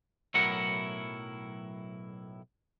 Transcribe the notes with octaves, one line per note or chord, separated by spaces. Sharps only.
B1 A2 F#3 E4 A#4 F#5